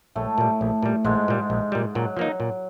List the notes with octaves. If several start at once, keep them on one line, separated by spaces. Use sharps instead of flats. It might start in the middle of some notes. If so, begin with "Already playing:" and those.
A#1 A2 A3
A#2 G3
A#1
A#2 G3
A#1 G#2 G#3
A#2 G3
A#1
A#2 G3
A#2 F#3
F3 A#3 D#4
A#2